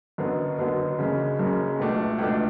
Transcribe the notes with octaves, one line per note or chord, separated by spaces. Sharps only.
F#1 F#2 D3 F#3 B3
F#1 F#2 D3 F#3 B3
F#1 F#2 C#3
F#1 F#2 C#3
C#2 B2 A3 D4
C#2 B2 A3 D4